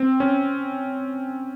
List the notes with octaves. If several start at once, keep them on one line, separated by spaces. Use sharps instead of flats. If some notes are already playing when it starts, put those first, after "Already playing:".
Already playing: C4
C#4